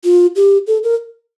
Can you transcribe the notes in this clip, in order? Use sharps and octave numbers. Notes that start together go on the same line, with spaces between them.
F4
G4
A4
A#4